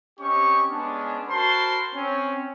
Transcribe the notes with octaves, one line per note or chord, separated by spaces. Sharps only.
C4 C#4 G4 D#5 C#6
G#3 B3 C#4 D4
F#4 A#4 C5 A5 B5 C6
C4 C#4